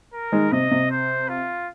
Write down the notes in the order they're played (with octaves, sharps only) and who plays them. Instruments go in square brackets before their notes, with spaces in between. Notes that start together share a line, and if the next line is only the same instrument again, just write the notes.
[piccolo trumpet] A#4
[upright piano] D#3 G#3
[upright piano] C3 [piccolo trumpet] D#5
[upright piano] C3
[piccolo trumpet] C5
F4